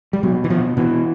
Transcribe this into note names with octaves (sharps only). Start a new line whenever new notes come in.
G3
B2 F#3
E3
B2 F3
B2 E3